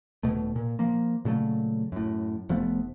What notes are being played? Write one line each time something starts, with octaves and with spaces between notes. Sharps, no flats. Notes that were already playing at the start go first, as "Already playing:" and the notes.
D#1 E2 B2 A3
A#2
F3 A#3
A#2 C#3 F#3 A3
F#2 A2
F1 F3 A3 B3